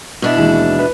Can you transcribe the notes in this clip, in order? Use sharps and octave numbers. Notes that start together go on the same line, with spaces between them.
B2 D4 E4
D#2 E3 G#3
B4